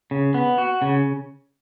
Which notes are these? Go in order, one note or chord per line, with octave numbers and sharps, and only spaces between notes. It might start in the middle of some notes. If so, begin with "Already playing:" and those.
C#3
B3
F#4
C#3